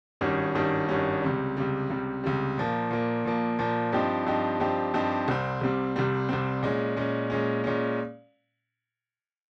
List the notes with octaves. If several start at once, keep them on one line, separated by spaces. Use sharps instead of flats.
G#1 G2 D#3 G3 C#4
G#1 G2 D#3 G3 C#4
G#1 G2 D#3 G3 C#4
C#2 C3 G3
C#2 C3 G3
C#2 C3 G3
C#2 C3 G3
A#2 F3 A#3
A#2 F3 A#3
A#2 F3 A#3
A#2 F3 A#3
G2 F3 C4 D#4 G4
G2 F3 C4 D#4 G4
G2 F3 C4 D#4 G4
G2 F3 C4 D#4 G4
C2 C3 G3 C4
C2 C3 G3 C4
C2 C3 G3 C4
C2 C3 G3 C4
A#2 G#3 C#4
A#2 G#3 C#4
A#2 G#3 C#4
A#2 G#3 C#4